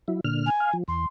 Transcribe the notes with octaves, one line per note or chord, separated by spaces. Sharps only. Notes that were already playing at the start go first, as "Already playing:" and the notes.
F#3 E4
A#2 D3 F6
G#5
F5
F3
E2 C6